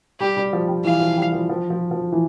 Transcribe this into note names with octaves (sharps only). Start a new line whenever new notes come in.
G3 G4
G3
F3
G3
E3 F5
F3
G3
F3
F3
F3
F3
E3